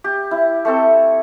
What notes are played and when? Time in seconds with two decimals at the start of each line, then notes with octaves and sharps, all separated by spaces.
0.04 G4
0.31 E4
0.65 A3 C4 A4